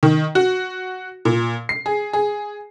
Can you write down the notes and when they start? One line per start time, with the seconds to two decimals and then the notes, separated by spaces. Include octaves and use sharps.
0.03 D#3
0.35 F#4
1.25 A#2
1.69 C7
1.86 G#4
2.13 G#4